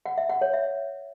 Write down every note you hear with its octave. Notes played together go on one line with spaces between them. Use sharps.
F#5
E5
F#5
C#5
E5